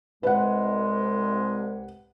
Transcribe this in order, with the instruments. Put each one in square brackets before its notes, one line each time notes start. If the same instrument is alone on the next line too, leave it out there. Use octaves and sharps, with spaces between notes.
[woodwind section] C2 G#3 [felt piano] B4 F#5